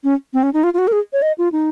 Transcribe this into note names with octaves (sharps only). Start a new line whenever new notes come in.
C#4
C4
C#4
D#4
F4
F4
F#4
A#4
G#4
C#5
D#5
F4
D#4